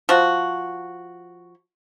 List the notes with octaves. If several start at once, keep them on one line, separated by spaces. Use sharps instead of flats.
F3 F#4